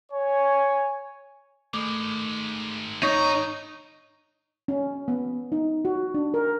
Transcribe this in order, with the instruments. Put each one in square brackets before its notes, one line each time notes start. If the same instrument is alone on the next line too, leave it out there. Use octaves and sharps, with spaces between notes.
[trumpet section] C#5 G#5
[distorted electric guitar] D#3 G#3 [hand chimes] A3 D6
[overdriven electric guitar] D#4 [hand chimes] C#5 [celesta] C#6
[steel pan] C#4
B3
D#4
F#4
D4
A#4